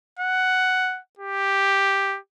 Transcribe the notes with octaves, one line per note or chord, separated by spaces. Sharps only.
F#5
G4